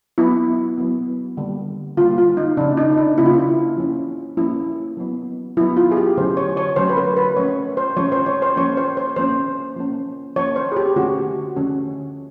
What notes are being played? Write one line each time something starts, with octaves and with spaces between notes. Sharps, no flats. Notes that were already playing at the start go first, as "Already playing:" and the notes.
F#3 B3 E4
F#3 B3
D3 G3 A#3
D3 G3 A#3 F4
F4
D#4
C#3 F3 A#3 C#4 D4
D#4
D#4
D4
C#3 F3 A#3 C#4 E4
F4
E4
F3 A#3 C#4
F3 A#3 C#4 E4
F#3 B3
F#3 B3 E4
F4
G#4
G4
D3 F#3 A3 C#4 C5
C#5
C#5
D3 F#3 A3 C#4 C5
B4
A#4
B4
F3 A3 C#4 C#5
C5
F3 A3 C#4 C#5
C5
C#5
C5
F3 A#3 C#4 C#5
C5
C5
F3 A#3 C#4 C5
F3 A#3 C#4
F3 A#3 C#4 C#5
C5
G#4
G4
D3 F3 A3 C#4 F#4
D3 F3 A3 C#4